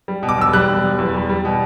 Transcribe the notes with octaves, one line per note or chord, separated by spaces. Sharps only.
G3
B2
D6
E1 E6
G3 F#6
E1
E1
E2
G3
G3
B2